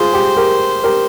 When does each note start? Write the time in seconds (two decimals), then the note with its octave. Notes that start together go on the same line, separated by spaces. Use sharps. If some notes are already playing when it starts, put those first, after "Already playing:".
Already playing: F4 G#4 C5
0.14 G4
0.37 G4 A#4
0.84 G4 A#4